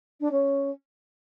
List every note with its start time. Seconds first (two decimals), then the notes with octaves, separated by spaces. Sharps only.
0.20 D4
0.31 C#4